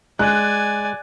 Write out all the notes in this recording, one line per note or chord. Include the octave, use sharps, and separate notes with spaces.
G#3 D5 G#5 F#6